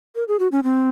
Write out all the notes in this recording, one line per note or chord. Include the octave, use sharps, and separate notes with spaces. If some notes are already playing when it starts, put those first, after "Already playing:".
A#4
G#4
F#4
C#4
C4